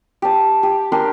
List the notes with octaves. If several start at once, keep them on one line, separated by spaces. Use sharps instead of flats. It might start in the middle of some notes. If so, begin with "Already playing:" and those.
G4 A5
G4
D4 G4 A#4 C6